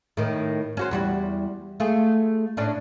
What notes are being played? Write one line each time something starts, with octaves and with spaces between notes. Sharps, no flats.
A2 D#3
C#4 F#4 C5
E2 G3 F#4
A3 F4 G#4
A2 C#4 D4